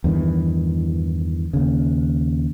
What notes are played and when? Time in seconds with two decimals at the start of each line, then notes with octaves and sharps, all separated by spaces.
0.04 E2 G2 D#3 E3
1.53 D#2 C#3